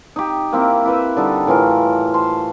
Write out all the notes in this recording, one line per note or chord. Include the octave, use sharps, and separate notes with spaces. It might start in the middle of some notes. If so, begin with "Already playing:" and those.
D#4 G4
A#3 C4 E4 A#4
E4 B4 E5
D3 G3 D#4 A4
A2 E3 F4 A#4
C5 A5 C6